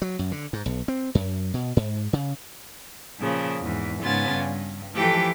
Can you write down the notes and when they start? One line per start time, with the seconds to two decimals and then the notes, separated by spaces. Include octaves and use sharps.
0.02 F#3
0.19 F#2
0.32 D3
0.53 G#2
0.66 B1
0.88 C4
1.15 F#2
1.54 B2
1.77 G#2
2.13 C#3
3.19 A#2 C#3 F3
3.60 E2 G#2
4.02 G#2 C#3 B3 F4 G#5 A6
4.31 G2
4.94 E3 F3 A3 G4 A4 G5